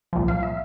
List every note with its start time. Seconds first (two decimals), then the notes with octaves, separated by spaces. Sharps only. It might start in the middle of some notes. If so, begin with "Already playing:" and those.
0.13 C2 A#2 F3
0.28 F5
0.43 E5